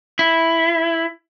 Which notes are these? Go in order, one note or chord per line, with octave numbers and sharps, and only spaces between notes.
E4